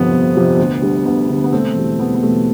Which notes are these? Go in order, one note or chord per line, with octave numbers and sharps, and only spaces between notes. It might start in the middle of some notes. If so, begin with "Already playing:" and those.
Already playing: G1 F2 C3 F3 B3
G1
F2 C3 F3
D2
D3 G3
D2 B3
D3 G3
B3
E1 A3 C4
E2 B2 G3
E1 B3
B3
E2 B2 G3 A3